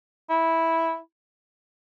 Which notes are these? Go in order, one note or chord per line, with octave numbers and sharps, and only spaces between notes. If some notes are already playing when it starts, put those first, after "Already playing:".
E4